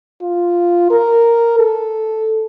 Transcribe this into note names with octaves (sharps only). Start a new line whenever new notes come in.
F4
A#4
A4